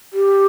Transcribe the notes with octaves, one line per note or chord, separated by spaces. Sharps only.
G4